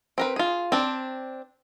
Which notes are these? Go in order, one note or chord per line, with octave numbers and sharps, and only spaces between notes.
C4 A#4 B4
F4 G#4
C4 D4